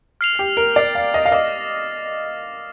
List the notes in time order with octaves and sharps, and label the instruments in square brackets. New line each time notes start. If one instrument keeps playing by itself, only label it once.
[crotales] F6 C7 F7
[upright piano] G4
A#4
[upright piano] D5 [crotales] F6 A6 C7 F7
[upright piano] F5
D#5
F5
[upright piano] D#5 [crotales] D6 F6 A#6